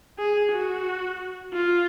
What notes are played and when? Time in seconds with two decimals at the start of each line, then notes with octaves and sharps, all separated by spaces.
0.19 G#4
0.52 F#4
1.53 F4